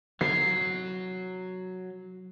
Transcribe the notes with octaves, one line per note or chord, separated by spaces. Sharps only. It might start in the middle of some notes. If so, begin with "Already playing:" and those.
F#3 C7